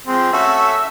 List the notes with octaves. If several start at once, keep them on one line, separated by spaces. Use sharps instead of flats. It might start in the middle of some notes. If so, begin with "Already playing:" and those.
F3 G#3 C4
A3 C#4 F#4 A4 E5